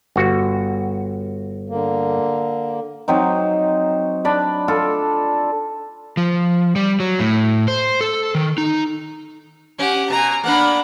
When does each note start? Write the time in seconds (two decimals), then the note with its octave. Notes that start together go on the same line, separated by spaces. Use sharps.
0.16 G1 F#4
1.69 D3 A#3
3.08 F#3 C4 D#4
4.25 D4 D5 B5
4.68 F4 A4
6.17 F3
6.76 G3
7.00 F#3
7.20 A2
7.68 C5
8.01 A4
8.35 D#3
8.58 D#4
9.79 C#4 G4 F#5
10.10 B2 G#5 A#5
10.44 A#3 B3 D4 F#5 B5